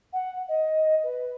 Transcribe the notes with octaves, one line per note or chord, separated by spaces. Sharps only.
F#5
D#5
B4